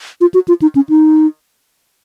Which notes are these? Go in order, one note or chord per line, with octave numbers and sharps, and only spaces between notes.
F4
F#4
F4
D#4
C#4
D#4